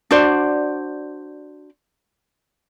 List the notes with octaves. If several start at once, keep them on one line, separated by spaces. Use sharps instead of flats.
D4 F#4 C5 D5